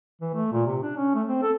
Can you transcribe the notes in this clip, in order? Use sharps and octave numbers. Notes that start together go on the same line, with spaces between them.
E3
A3
A#2
C3
D4
C#4
A3
C4
A4